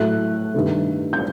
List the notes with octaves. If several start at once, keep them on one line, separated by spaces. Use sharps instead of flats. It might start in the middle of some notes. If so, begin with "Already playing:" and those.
Already playing: A2 F#3 A3 F#6
G2 D#3 A3
G6